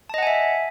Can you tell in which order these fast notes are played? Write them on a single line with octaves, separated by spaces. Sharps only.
A5 D#5 F#5 G#5 E5